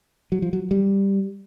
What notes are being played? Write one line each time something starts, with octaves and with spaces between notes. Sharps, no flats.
F#3
F3
F#3
G3